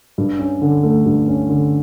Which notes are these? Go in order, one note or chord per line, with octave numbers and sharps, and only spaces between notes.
G2
C#4
D3
A3
G2
C#4
D3